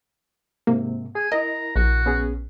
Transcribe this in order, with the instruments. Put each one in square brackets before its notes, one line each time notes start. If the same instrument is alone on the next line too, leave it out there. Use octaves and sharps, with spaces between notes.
[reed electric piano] G#2 C3 [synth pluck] A#3
[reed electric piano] G#4 [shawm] G#5
[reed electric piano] E4 A#4 [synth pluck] D#5 [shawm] A#5
[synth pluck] A#1 [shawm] F#4
[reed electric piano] B3 C#4 G#4